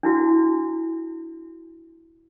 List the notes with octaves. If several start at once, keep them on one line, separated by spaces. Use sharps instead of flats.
D4 E4 F#4